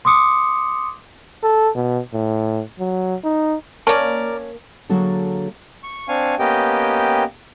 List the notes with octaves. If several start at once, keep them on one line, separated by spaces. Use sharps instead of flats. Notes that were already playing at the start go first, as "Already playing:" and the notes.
C6 D6 D#6 C#7
A4
B2
A2
F#3
D#4
A#3 C#4 A#4 D5 A5
D3 F#3 A#3 F#4 G#4 A4
C#6
C4 D4 F5 G#5 C#6
A#3 B3 C#4 G4 D#5 G5